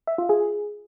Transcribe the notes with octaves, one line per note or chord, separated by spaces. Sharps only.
E5
F4
G#4